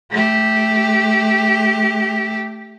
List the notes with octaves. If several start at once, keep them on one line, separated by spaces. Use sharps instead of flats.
A3 G4